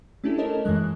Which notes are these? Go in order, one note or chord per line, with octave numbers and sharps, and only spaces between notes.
A3 C#4 D4 E4 G4 A4
G4 A4 A#4 C#5 D#5 A5
F#2 E3 F#3 G#3 F#6